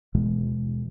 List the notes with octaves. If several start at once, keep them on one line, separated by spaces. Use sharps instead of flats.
D#2 B2 E3 G#3